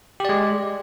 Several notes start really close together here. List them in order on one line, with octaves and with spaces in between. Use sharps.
G4 D5 G#3